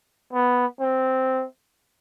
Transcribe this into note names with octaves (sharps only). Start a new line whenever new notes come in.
B3
C4